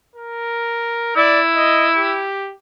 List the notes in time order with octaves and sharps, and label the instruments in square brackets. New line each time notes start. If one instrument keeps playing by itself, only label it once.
[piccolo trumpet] A#4
[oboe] E4 [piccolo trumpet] D5
[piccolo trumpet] D#5
G4